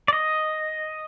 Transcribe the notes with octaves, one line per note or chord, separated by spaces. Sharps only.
D5
D#5